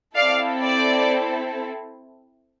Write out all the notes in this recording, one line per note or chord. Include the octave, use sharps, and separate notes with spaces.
C4 E4 A4 D5 F5
D5